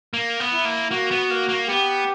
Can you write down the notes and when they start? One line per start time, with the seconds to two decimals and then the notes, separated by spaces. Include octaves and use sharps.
0.14 A#3
0.40 B3
0.53 E4
0.65 A#3
0.91 A#3 F#4
1.11 B3
1.31 A#3
1.49 A#3
1.68 B3 G4